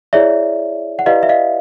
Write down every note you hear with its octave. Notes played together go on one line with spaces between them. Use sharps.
E4 G#4 C#5 D5 E5
F#5
E4 G4 B4 D5 D#5 F5
E5
D#5 F5